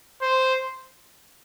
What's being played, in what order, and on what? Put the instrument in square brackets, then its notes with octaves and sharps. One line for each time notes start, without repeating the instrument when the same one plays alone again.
[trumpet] C5